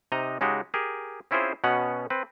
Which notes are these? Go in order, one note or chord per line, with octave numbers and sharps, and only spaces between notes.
C3 D#4 D#5 A#5
C#3 G#3 D#4 F#4 G4
G4 G#4 A#4
C4 C#4 E4 F4 G#4 C5
B2 B3 C#4 F#5
C4 B4